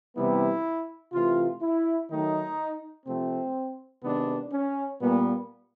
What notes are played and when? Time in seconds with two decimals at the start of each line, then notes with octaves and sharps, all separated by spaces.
0.16 C3 E3 G3 B3 E4
1.13 C3 E3 A3 F4
1.62 E4
2.10 D#3 F#3 A3 D#4
3.06 C3 F3 A3 C4
4.03 C3 D#3 G#3 B3 D4
4.52 C#4
5.01 A#2 G3 A#3 B3